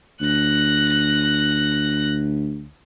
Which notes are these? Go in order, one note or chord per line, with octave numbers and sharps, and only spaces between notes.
D2 F#6 A#6